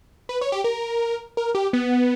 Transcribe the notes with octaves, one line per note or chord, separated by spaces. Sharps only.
B4
C#5
G4
A#4
A#4
G4
B3